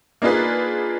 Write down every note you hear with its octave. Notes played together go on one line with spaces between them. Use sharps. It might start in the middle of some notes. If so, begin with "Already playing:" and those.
A#3 D4 D#4 F4 G#4 B4